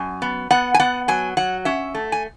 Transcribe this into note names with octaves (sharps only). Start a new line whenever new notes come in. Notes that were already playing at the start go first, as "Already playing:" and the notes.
Already playing: F#2 G#5
B3
B3 F#5
G#5
B3 F#5
F#3 G#5
F#3 F#5
C#4 E5
A3
G#5